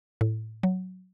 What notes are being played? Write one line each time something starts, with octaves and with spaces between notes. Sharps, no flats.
A2
F#3